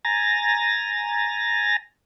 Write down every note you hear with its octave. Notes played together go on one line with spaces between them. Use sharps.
G#5 A#5 A6 A#6